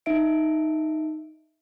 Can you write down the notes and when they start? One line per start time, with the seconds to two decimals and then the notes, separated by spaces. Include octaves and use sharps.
0.06 D#4 E5 D7